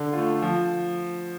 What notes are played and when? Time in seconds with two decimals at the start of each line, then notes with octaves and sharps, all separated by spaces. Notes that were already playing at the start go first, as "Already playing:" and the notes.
Already playing: D3
0.13 A3 F4
0.42 F3